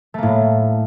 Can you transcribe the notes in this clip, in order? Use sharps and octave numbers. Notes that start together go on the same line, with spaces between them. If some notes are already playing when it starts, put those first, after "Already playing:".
A2 A3 A#3